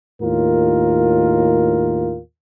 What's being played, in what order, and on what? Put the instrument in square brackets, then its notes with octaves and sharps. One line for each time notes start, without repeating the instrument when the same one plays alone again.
[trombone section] D#2 A2 F4 A#4